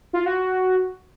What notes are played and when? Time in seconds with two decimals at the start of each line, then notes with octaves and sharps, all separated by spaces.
0.13 F4
0.26 F#4